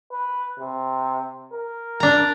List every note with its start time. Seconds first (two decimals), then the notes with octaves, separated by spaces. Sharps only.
0.12 B4
0.59 C3
1.53 A#4
2.00 D4 A#5